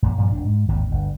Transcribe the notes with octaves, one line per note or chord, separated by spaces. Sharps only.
F#2 A#2 F3
G2 A#2 F3 F#3
E1 D4
G#2
G#1 D#2 A2 C3
G1 D2